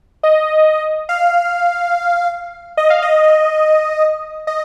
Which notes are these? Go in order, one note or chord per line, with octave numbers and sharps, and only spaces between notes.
D#5
F5
D#5
F5
D#5
D#5